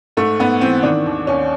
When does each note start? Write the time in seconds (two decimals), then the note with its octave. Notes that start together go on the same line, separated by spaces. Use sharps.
0.17 G#2 A3
0.39 G#2 B3
0.61 E3 C4
0.83 D#3 D4
1.06 D#2
1.27 D#2 C#4